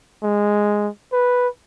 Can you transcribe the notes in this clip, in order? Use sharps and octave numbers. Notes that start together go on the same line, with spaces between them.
G#3
B4